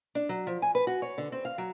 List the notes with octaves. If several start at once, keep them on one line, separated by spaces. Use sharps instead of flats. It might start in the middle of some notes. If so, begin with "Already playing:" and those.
D4
F#3
F3
G#5
B4
F#4
C#5
D3
C4
F5
F#3